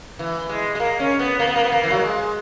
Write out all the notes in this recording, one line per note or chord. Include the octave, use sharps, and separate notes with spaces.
E3
G#3
G#3
A#3
C#4
B3
A#3
B3
A#3
B3
A#3
E3
F#3
G#3